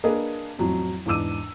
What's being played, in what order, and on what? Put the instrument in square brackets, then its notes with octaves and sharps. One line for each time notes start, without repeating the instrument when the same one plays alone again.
[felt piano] A#3 D4 G#4 A#4 B4 D#5
A1 F2 F#3
E2 G#2 D4 D6 E6 D#7